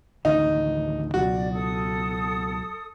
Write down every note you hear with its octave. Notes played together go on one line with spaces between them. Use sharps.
A1 D2 D#3 D#4
C#2 B2 F#3 F#4 D5
A4 D#6